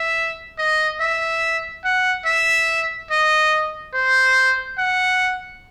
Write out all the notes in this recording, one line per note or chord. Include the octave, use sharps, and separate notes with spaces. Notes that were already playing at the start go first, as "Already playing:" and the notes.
Already playing: E5
D#5
E5
F#5
E5
D#5
C5
F#5